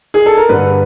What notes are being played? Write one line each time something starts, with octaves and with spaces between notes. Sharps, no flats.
G#4
A4
A#4
G2 D3 B4